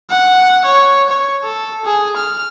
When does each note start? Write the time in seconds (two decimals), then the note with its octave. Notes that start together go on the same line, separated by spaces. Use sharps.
0.10 F#5
0.65 C#5
1.09 C#5
1.44 A4
1.85 G#4
2.16 F6